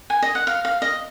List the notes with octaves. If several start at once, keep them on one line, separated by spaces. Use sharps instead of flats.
G#5
D#5
F#5
F5
F5
D#5